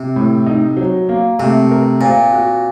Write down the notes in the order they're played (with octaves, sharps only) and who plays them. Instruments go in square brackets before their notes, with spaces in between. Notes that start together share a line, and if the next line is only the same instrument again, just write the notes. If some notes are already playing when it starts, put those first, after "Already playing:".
Already playing: [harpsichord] C3
[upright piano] A2
D#4
F#3
A#3
[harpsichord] C3 [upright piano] A3
[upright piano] A#4
[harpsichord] A#2 [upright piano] C4
[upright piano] F#4